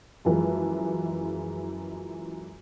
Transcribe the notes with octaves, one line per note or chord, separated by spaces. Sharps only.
F#2 E3 F3 G#3